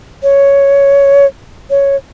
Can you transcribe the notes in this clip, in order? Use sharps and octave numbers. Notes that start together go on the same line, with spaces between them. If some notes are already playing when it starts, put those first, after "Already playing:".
C#5
C#5